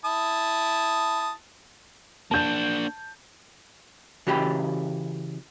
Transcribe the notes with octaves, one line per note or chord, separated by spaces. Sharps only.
E4 A5 D#6
A#3 D4 A5 G6
C#3 E3 F#4 G4 G5 B5